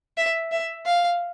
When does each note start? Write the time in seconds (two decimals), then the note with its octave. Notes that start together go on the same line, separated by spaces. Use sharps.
0.17 E5
0.52 E5
0.86 F5